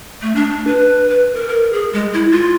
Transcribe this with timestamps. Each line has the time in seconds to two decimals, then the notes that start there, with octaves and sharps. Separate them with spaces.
0.22 A3
0.35 D4
0.67 B4
1.09 B4
1.34 A#4
1.48 A#4
1.73 G#4
1.93 G#3
2.14 E4
2.31 F4